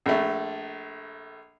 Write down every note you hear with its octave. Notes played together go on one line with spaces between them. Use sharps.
A#1 A3